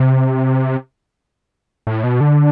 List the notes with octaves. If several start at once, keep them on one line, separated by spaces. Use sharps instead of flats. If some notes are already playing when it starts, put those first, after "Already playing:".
Already playing: C3
A2
B2
D3